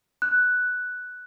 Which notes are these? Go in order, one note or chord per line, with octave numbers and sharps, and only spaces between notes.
F#6